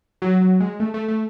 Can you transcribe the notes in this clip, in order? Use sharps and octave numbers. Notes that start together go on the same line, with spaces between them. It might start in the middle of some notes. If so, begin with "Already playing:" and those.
F#3
F#3
G#3
A3
A3
A3